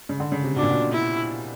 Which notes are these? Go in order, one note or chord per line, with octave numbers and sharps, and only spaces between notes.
C#3
D3
C#3
C3
B2 D4
A#2
B2
E4